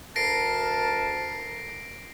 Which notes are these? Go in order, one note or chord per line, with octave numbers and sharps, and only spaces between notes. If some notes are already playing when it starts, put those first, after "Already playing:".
D2 A#4 A5 A#6 C7 D7